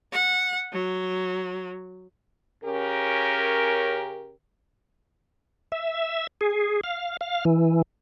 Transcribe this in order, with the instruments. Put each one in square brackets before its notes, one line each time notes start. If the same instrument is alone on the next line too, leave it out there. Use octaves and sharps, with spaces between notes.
[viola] F#5
F#3
[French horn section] C#3 C#4 G4 A#4
[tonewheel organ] E5
G#4
F5
F5
E3